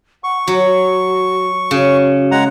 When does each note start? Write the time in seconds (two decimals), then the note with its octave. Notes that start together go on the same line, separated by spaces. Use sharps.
0.24 F#5 C#6
0.47 F#3 F#4
0.65 F#4
1.71 C#3 F#4
2.31 G#3 F#5 A#5